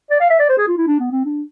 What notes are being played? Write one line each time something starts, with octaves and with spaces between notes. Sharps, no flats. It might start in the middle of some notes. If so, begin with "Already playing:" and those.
D5
F5
E5
D5
C5
G#4
F4
E4
D4
B3
C4
D4